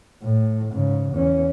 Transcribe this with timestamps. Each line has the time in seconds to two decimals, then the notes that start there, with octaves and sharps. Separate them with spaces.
0.23 A2
0.73 G#2 C#3
1.12 E2 C#4